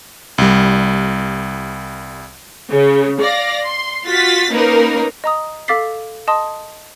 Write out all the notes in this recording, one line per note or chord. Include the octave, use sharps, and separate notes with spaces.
C2 G3
C#3
D5 F5 A#6
C6
F4 F#4 A6 B6
A#3 C#4 D#4 A#4 B4
D#5 A#5 D#6
A4 F5 D6 A6 B6 C7
D#5 A5 C6 D#6